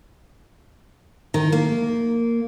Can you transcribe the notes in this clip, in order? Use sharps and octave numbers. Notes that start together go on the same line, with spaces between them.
D#3
A#3